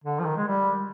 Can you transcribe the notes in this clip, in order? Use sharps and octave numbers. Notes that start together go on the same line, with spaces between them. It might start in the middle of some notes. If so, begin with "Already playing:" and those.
D3
F3
D#3
G#3
G3